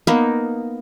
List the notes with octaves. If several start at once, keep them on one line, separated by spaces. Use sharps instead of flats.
A#3 B3 D#4